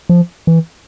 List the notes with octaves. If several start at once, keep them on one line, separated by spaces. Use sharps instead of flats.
F3
E3